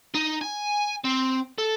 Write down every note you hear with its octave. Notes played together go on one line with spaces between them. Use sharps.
D#4
G#5
C4
A4